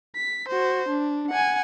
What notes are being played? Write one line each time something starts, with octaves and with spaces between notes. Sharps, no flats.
B6
F#4 C5
D4
F#5 G#5